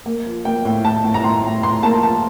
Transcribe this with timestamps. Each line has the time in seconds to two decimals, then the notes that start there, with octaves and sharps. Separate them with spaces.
0.06 A#3
0.26 F3
0.45 A#3 G5
0.65 A2
0.85 A2 A5
1.04 A2
1.14 A#5
1.23 A2 C6
1.43 A2
1.63 A2 C6
1.83 A#3 A5
2.03 F3 A5